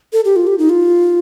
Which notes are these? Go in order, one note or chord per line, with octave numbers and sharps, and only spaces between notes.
A4
G4
F4
G4
D#4
F4